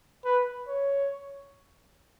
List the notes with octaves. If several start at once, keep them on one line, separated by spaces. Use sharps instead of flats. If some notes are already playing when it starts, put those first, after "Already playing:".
B4
C#5